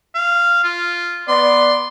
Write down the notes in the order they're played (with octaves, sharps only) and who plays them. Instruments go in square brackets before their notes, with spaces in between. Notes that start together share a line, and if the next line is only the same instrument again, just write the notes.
[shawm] F5
F4
[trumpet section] B3 D5 [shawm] C6